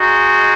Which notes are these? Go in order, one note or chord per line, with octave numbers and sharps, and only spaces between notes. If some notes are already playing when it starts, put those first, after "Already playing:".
Already playing: G#3 D#4 F#4